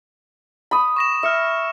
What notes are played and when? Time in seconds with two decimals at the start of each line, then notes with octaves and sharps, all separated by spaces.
0.71 B5 D#6
0.96 C#6 A#6 E7
1.23 E5 F6 C#7 E7